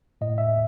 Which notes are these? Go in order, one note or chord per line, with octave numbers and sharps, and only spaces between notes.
A2 D#5
E5